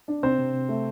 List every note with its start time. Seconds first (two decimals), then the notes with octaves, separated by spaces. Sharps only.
0.08 D4
0.22 C3 C4 C5
0.38 C3
0.53 C3
0.69 A3